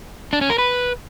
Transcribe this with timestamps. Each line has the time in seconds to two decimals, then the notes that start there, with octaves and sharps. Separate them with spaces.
0.33 D4
0.41 C#4
0.50 A#4
0.58 B4